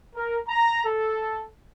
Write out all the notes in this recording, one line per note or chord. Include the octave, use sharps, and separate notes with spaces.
A#4
A#5
A4